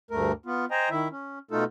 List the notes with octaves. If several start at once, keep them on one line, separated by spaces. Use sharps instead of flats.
D2 G2 A3 A#4
B3 F4
C5 D#5 G5 G#5 A#5
D#3 E4 E5
C#4
B2 A3 D#4 F4 A4